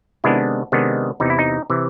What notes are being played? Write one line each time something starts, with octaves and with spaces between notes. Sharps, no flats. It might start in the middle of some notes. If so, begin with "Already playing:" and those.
C3 D#3 G#3 B3 D4 E4
C3 D#3 G#3 B3 D4
E2 C3 E3 D#4
E4
D#4
C3 E3